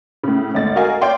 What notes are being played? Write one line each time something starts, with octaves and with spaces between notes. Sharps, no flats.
A2 C#3
G#1 D2 A6
F#4 A#4 D#5 F5 G#5
C#5 D5 F5 G5 C6